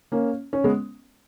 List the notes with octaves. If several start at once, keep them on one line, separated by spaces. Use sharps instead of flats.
A#3 C#4
C#4
G#3 B3